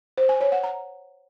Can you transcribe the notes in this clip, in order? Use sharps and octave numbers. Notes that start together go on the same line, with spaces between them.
C5
G#5
C#5
F#5
A#5